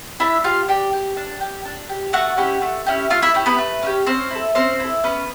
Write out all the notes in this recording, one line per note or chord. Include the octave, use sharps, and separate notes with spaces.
D4 E4 E5
F4 G4 F5
D4 G4 G5
G4
D4
G4
D4
G4
A3 F#4 F#5
C#4 E4 G4
A3
C#4 E4 G4
A3 F4 F5
E4 E5
C#4 E4 G4
B3 B4
A3
C#4 E4 G4
C4 C#4 C5
E4 A4
C4 C#4 C5
E4 A4
B3 C#4 B4